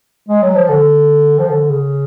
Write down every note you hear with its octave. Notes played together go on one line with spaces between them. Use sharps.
G#3
F#3
F3
D3
F3
D3
C#3